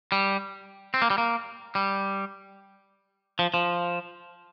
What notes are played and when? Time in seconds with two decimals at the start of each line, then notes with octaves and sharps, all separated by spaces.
0.12 G3
0.94 C4
1.02 A#3
1.10 G3
1.18 A#3
1.75 G3
3.39 F3
3.54 F3